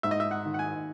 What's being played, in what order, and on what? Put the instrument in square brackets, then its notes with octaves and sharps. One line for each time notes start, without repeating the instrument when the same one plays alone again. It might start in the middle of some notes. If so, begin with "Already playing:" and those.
[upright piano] G#2 [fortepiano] E5
[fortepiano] D#5
E5
F#5
[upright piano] D#3
[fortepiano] F#5
G#5